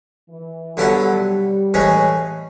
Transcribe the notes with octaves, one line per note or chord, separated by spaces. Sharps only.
E3
D3 F#3 G3 B3 E4 A4
A2 E3 G#3 C#4